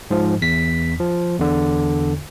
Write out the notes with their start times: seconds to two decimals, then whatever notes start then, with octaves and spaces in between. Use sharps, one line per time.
0.11 G#2 F3
0.42 E2 B6
1.00 F3
1.39 E2 D3